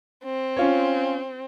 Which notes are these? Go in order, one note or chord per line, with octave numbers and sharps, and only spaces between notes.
C4
C#4 F4 C#5